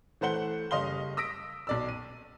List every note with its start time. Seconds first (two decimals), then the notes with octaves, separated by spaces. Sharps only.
0.21 E3 A3 C5 F#5 G7
0.71 F#1 G3 D#5 F5 C6 G7
1.17 D#6 E6 A#6 B6 D7
1.67 B1 D5 E6
1.89 D#7